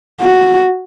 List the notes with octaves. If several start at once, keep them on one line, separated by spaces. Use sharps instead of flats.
F#4